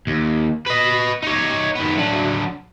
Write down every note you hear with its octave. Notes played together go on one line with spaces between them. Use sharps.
D#2
B4 D#5
D#4 C#5
D#3 B3
F#3 D4